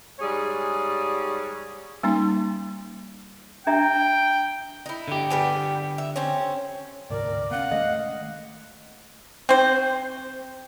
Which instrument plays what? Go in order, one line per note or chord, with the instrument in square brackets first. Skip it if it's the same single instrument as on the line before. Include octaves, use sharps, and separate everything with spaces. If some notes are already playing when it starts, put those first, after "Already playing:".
[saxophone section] G#2 G3 G#4 C#5
[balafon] G3 A#3 C#4 D#4
[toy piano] D4 E5 A#5 [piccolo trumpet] G5
[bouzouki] D#4 E4
[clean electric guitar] D3 G4
[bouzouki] G3 B3 G#5
E5
C4 C#4
[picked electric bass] D2 G#2 C3 [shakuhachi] A#4 [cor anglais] D5
[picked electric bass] B3 C#4 [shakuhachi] F5 [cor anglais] F#5
[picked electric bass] D#3 G#3 A3 [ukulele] D#5
[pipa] C4 C5